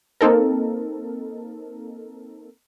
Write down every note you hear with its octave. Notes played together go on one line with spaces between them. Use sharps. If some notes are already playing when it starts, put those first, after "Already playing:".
A#3 C4 D#4 A4 A#4